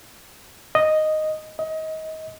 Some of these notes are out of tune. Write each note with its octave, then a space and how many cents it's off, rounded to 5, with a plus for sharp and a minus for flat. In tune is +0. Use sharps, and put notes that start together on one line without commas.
D#5 -5
D#5 +25